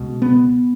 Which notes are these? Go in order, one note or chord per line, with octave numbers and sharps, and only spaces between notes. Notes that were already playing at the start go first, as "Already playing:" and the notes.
Already playing: C#2 B2
B3